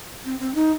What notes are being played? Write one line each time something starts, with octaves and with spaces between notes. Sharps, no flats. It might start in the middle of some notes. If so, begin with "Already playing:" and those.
C4
C4
D#4